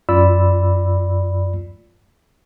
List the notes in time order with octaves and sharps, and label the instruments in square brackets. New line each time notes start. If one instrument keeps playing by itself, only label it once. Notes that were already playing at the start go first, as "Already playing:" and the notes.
[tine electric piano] F#2 F4 D5 B5 E6